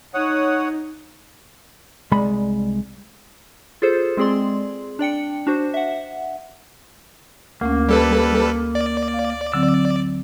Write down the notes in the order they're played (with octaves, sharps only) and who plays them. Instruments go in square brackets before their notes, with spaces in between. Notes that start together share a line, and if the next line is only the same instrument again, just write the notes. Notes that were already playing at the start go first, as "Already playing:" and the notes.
[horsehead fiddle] D#4 [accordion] C#5 F#5 D#6
[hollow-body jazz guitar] C2 G#3 D5 B5
[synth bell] F4 G#4 A4 C5
G#3 C4 G#4 D5 C6
D4 D5 G5 C#7
D4 F#4 C5
E5 F#5
[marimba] D2 A3 C#4 [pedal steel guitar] A#3
[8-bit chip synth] G3 A4 B4
D5
[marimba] F5
[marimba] D3 F#3 C4 [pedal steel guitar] E6